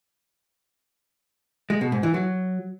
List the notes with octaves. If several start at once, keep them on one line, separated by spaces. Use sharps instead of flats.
G#3
B2
G#2
E3
F#3